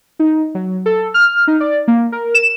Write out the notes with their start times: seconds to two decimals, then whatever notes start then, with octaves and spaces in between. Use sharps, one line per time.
0.19 D#4
0.55 F#3
0.86 A4
1.14 F6
1.47 D#4
1.60 D5
1.88 A#3
2.12 A#4
2.34 E7